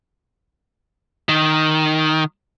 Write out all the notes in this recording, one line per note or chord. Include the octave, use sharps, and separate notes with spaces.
D#3